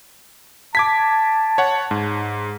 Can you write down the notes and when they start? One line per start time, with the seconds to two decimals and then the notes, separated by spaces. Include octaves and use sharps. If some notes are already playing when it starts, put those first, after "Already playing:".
0.75 A5 D6 G#6 B6
1.58 C#5 F#5
1.91 G#2